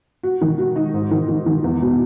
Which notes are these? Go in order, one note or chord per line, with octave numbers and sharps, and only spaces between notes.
F#4
D#3
F#4
D#4
G#2
D#3
D#3
D#3
E2
B2